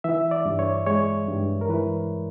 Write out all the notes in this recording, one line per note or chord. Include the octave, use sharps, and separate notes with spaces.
E3 E5
D5
G2
C#5
G#3 C#5
G2
A#4
E3 B4